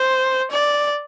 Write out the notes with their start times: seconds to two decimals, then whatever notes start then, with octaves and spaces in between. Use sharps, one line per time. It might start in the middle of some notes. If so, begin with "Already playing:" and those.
Already playing: C5
0.51 D5